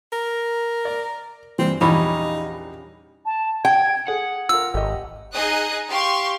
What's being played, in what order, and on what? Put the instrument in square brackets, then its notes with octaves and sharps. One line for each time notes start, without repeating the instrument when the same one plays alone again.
[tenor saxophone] A#4
[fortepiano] D5
[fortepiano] G2 E3 [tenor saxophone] C4
[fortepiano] A#1 E2 [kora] G3 C#4 E4 [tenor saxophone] D#4
[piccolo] A5
[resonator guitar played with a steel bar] G5 [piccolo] G#6
[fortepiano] G#4 [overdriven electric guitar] F#5
[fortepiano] F4 A#4 [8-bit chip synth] E6
[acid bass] G#1 [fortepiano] G4 D#5
[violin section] D#4 G#4 D#5 D#6 F#6
G4 F5 C6 C#6